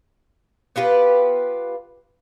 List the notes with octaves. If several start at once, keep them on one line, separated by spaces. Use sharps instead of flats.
B3 F4 G4 B4